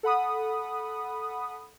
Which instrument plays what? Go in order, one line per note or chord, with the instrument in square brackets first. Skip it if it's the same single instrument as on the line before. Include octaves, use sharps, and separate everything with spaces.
[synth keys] A4 F#5 B5 D#6